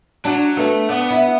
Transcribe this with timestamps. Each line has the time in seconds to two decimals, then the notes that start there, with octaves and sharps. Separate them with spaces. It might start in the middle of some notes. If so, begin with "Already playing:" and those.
0.25 F#3 D4
0.57 A3 B3
0.89 B3 D4
1.11 E4